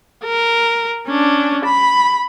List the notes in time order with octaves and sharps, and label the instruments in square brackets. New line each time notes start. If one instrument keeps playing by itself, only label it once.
[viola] A#4
C#4 D4
B5